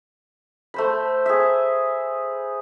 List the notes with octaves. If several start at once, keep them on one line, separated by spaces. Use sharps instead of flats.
A3 C5 B5
G#4 E5